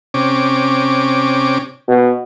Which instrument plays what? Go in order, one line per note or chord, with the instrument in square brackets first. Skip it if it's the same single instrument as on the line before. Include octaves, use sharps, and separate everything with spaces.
[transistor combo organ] C3 C#4 D6
[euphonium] B2